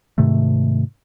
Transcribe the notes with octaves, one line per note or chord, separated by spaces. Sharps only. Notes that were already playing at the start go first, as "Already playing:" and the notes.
G#2 C3 D#3 A3